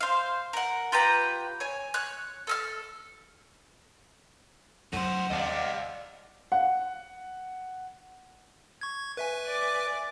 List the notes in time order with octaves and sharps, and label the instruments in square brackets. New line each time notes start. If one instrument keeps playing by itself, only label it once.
[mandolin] C5 F5
A#4 F#5
F4 G4 B4 A#5
C#5 G#5
C#5 F#6
A4 E6 F6
[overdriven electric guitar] A2 C5 [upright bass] C#3 F#3 [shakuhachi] F#5
[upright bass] D#2 [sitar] C3 G3 D5 [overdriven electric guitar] D#5 F5
[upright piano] F#5
[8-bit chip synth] C#6 G#6
B4 E5 G#5
[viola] D5 D6